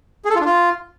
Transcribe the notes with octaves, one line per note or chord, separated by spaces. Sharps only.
G#4
A4
F4
D4
F4